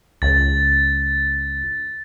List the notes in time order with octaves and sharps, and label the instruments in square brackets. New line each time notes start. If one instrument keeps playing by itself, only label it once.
[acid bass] C#2 [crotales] A6